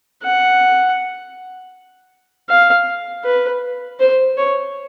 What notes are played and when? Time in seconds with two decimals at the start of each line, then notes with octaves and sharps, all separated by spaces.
0.23 F#5
2.49 F5
3.25 B4
4.00 C5
4.37 C#5